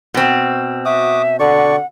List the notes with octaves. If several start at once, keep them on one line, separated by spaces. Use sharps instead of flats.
B2 C4
F#4 E5 D6 D#6
D3 D5 F#5 C#6